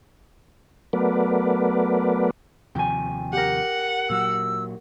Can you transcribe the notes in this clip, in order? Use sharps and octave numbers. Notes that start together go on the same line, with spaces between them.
F#3 A3 B3 A#4 B4 D5
D#2 C3 F3 G5 G#5
G4 A#4 F#5
A#2 F#3 E6